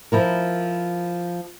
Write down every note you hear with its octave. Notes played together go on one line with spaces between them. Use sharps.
F3 E4 A#4